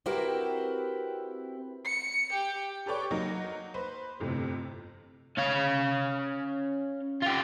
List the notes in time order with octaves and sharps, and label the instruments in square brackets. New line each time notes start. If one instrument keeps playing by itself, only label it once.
[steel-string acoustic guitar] C4 E4 F#4 G4 A#4 B4
[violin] C#7
G4
[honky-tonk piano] G4 A4 B4 C#5 D5 G5
F#3 A#3 D#4
B4 C5
G1 F2 A2 C3
[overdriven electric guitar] C#4 F5
F4 G4